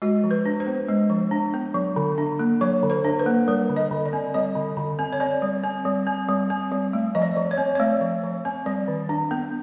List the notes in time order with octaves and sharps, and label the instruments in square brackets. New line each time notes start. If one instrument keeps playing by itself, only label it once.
[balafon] G#3 F#4
F3
B4
D4
C5
B3
G#3
F3
D4
B3
F#3
D3
D4
A#3
F#3 C#5
D3
C5
D4
B4
A#3
G3 A#4
D3
D#5
D3
D5
C4
G3 D#5
D3
D3
C4
C#5
C4 D5
G3
C4
G3
C4
G3
C4
G3
A3
F3 D#5
D5
F3
C#5
C4
C#5
A3 D5
F3
F3
C4
G3 D5
D#3
D4
B3